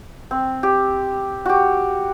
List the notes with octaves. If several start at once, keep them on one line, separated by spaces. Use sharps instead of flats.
C4
G4
F#4 G4